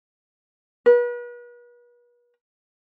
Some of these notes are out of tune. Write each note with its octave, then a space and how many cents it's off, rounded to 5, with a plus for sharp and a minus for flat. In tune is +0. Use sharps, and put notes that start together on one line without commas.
B4 -40